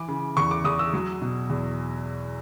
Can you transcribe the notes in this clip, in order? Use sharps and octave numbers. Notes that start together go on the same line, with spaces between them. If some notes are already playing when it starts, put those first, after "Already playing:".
Already playing: E3 D6
C#3
E2 C#6
D6
E2 D#6
E6
F#3
B2
E2